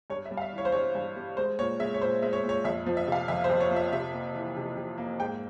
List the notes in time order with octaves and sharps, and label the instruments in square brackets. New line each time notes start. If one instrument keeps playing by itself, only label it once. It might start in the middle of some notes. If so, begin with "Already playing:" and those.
[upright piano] G2 C#5
E5
G3
F5
E5
E3
C#5
C5
G2 C#5
G2
G3
G#3 C5
A#2 C#5
G#3 E5
C#5
A#2 C5
G#3 E5
C#5
A#2
C#5
F2 E5
F3
E5
C3
F5
F2 E5
C5
F2
C#5
F3
E5
C3 E5
A#3
E3
C3
C3
A#3
G#2 G5